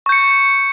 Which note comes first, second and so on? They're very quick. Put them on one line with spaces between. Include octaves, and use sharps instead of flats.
C#6 G6 C#7